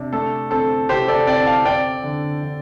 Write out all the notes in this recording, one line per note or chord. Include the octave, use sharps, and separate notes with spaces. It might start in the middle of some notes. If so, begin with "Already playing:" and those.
Already playing: C3 D4
A3 A4
C4 A4
C3 G4 C5
A4 D5
C4 D5 G5
F5 A5
C4 D5 G5
D3
D3